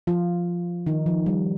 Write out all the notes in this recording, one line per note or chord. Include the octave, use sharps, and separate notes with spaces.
F3 F4
D#3 D#4
F3
G3